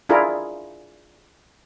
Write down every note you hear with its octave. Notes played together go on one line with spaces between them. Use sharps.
D4 E4 F4 G#4 A#4